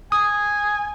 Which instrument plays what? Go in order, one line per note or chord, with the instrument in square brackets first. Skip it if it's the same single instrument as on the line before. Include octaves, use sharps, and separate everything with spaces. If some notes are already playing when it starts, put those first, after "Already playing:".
[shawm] G#5 [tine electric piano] D#6